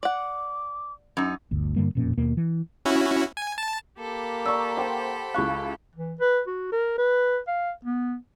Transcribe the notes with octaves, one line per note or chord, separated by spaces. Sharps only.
D5 F#5 D6
F#2 D#4
G1 D2
G2 D3 G3 A#3
E1 F2 A#2 C#4
D#2 B2 A#3
E3
C#4 E4 F#4
G#5
A5
A#3 G4 A4 B5
D5 A#5 C#6 E6
C5 F#5 G5
C#2 E4 F5 C#6 F#6
E3
B4
F#4
A#4
B4
F5
B3